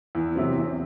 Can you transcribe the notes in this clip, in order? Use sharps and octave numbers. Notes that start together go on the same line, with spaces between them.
E2
C3 F#3 C4
E2